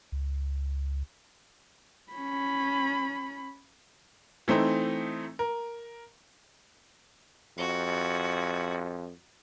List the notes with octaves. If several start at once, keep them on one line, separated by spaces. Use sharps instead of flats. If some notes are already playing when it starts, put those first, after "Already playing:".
C#2
C#4 B5
E3 A3 C4 D#4
A#4
F2 F#4